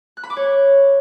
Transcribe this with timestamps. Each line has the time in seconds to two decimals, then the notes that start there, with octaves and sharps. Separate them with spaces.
0.17 F#6
0.23 B5
0.30 D6
0.37 C#5